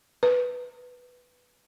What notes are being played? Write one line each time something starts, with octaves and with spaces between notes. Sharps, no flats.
B4